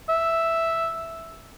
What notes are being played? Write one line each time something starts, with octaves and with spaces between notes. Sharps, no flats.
E5